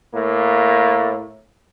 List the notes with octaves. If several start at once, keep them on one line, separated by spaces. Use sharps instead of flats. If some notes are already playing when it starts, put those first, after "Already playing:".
A2 A#3